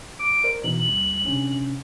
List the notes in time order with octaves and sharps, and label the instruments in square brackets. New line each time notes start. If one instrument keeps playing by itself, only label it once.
[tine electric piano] D6 [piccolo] D7
[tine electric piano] A#4 C5 D5
[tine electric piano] B2 E3 D#4 [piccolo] F#7
[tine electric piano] D#2 G3
C3 C#4 D4